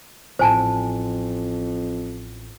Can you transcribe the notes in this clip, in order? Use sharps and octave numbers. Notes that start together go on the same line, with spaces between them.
A1 F2 C5 G#5 A5